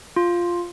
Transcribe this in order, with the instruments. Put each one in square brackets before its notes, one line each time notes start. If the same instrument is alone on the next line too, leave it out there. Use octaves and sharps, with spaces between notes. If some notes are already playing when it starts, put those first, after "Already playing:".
[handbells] F4